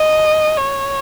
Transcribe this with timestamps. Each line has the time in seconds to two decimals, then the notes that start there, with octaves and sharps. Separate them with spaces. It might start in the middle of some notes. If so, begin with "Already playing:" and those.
Already playing: D#5
0.58 C#5